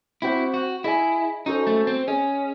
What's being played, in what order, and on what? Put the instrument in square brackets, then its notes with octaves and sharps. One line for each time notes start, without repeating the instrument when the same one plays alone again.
[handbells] C4 F#4 C5 F#5 [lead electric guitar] E4
[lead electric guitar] F#4
[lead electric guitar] E4 [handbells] G#4 D#5 G#5
[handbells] C#4 F#4 A4 C5 [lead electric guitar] D#4
[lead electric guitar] A3
C4
[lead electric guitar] C#4 [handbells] G#4 D#5 G#5